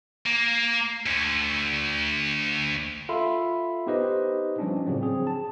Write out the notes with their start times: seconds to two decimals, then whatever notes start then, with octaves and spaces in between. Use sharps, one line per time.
0.26 A#3
1.06 D2
3.09 F4 A4 E5 F5 B5 C6
3.87 B3 D#4 G4 B4 C5 D#5
4.59 F3 G3 C#4 D4
4.86 A2 C#3 F3 F#3 C4
5.02 C4 G#4
5.27 A5